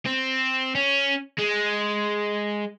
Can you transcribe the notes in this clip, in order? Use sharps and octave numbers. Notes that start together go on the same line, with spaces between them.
C4
C#4
G#3